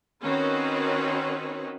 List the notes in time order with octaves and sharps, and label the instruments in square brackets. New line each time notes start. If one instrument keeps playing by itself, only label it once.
[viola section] D#3 C4 C#4 F#4 B4